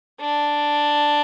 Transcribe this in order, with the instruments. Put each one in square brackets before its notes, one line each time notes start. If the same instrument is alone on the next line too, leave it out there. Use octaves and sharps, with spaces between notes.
[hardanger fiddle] D4